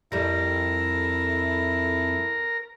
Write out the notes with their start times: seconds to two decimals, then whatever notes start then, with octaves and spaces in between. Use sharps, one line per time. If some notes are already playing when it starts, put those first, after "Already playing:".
0.12 F2 G3 E4 A4 A#4